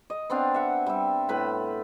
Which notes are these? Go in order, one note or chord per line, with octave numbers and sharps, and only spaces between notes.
D#5
B3 C4 D4 F5
E5 F#5
G3 E5
A2 B4 B5